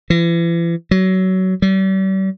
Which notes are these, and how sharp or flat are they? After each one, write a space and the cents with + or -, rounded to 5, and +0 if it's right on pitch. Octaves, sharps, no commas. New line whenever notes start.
E3 +40
F#3 +20
G3 -40